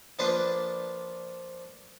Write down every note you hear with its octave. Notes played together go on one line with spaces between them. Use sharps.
F3 A#3 D4 B4 C5